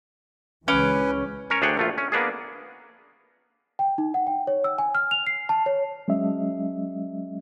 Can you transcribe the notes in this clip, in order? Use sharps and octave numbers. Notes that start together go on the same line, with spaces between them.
C#2 E3 G#3 C#4 B4 G#5 D6
C#4 A#4 C#5
D2 D4 G#4 C#5 F#5 G5
A#1 A3 F4
C#4
A#3 B3 D4 G#4
G5
D#4
F#5
G5
C#5
E6
G#5
F6
F7
C7
A5
C#5
F#3 G#3 C#4 D#5 E5